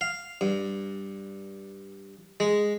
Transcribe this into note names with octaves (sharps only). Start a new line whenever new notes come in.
F5
G2
G#3